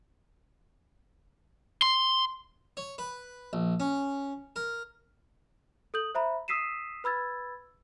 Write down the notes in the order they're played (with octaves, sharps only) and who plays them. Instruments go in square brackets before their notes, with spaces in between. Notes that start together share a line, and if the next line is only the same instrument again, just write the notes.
[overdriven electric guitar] C6
[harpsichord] C#5
B4
A#1
C#4
A#4
[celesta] A4 D#6 G6 F#7
C5 E5 A#5 B5
D#6 E6 B6 C7 D#7 E7
B4 B5 E6 G#6 A6